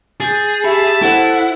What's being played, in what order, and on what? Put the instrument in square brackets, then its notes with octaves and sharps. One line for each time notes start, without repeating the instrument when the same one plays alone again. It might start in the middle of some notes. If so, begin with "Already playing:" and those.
[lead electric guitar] G#4 [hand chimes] G6 A6
[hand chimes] G4 G5 B5 [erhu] E5 [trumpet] A5
[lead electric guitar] E4 [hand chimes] A4 C5 [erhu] F#5